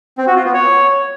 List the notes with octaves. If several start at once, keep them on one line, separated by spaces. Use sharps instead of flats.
C4
F#4
F4
B3
C#5